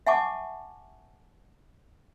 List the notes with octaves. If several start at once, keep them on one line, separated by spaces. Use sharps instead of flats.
E5 F#5 G#5 A5 C#6 D6